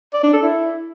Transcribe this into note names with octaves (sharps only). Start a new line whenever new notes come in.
D5
D4
A4
E4